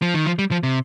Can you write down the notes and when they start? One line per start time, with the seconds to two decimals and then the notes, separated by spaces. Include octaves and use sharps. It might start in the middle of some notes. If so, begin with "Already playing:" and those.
0.02 F3
0.14 D#3
0.26 F3
0.39 G3
0.51 F3
0.63 C3